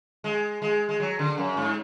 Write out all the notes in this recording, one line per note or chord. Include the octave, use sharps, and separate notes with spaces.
G#3
G#3
G#3
F#3
D3
F#2
G#2